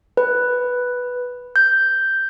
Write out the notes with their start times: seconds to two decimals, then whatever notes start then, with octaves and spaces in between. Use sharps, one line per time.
0.17 B4
1.56 G6